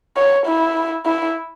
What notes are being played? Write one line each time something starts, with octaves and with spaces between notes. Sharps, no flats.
C#5
E4
E4